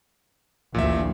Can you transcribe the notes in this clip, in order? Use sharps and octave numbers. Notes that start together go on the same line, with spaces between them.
A1 D2 A#2 F3 E5